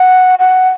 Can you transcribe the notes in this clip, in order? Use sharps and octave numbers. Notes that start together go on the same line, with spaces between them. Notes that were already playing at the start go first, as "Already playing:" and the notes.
Already playing: F#5
F#5